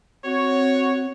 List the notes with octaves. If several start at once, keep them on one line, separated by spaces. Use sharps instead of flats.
C4 F#4 C#5